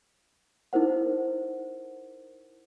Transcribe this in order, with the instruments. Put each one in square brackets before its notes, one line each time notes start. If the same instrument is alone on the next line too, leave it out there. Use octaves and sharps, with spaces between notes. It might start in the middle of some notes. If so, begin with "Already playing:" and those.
[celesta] D#4 E4 A#4 C5 F#5